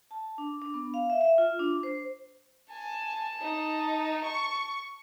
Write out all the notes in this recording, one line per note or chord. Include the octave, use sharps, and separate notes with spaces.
A5
D4
D4
B3
F5
E5
E5
F4
D4
C5
G#5 A5
D#4
C#6